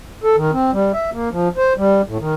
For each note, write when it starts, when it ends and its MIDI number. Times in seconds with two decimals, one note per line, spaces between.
0.24 0.36 69
0.36 0.51 51
0.52 0.71 60
0.73 0.92 55
0.94 1.10 76
1.13 1.29 58
1.32 1.48 53
1.57 1.74 72
1.77 2.02 55
2.08 2.18 45
2.20 2.35 51